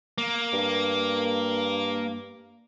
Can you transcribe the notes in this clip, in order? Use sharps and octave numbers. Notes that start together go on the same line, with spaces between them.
A#3
G2